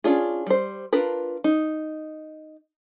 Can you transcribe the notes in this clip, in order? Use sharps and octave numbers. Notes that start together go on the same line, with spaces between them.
C#4 D4 F4 G#4
G3 C5
D4 F4 A#4 B4
D#4